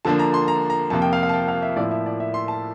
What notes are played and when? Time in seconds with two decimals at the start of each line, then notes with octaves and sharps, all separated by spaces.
0.05 D3 F3 A#3 D4 A5
0.19 A#5
0.34 C6
0.48 A#5
0.70 A#5
0.90 F2 C3 F3 A#3 A5
1.02 G5
1.13 F5
1.23 F5
1.29 A5
1.34 G5
1.48 F5
1.62 E5
1.76 A2 F3 A#3 E4 D5
1.91 E5
2.06 D5
2.20 E5
2.34 C6
2.48 A5